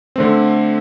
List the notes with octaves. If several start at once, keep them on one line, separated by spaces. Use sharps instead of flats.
D3 A3 C4